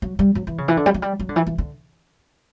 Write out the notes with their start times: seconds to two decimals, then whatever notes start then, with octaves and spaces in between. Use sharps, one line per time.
0.02 F#3
0.19 G3
0.35 F#3
0.47 E3
0.58 C#3
0.68 E3
0.77 D3
0.86 G3
0.94 F#3
1.02 G3
1.19 F#3
1.29 D3
1.36 E3
1.47 E3
1.58 D3